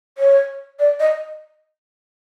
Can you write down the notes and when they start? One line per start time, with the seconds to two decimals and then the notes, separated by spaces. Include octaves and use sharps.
0.18 C#5
0.79 D5
1.00 D#5